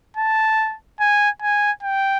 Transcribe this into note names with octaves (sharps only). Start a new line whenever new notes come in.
A5
G#5
G#5
G5